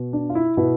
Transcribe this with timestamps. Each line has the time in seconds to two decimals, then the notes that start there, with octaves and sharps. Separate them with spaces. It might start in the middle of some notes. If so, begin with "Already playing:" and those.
Already playing: B2 B3
0.13 D4
0.30 F4
0.35 E4
0.57 B2 B3 E4